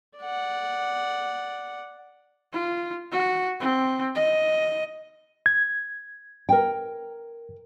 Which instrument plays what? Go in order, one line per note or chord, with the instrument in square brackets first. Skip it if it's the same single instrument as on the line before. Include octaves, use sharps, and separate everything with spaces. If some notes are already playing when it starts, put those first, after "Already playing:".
[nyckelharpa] D5 F#5
[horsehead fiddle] F4
F#4
C4
D#5
[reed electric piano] G#6
[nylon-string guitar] A#4 G5